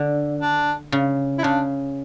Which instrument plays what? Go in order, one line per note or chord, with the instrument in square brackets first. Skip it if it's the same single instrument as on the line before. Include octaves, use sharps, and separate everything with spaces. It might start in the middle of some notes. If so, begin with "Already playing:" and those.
Already playing: [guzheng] D3
[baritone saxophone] D4
[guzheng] C#3
[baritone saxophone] E4
[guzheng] C#3 [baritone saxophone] D4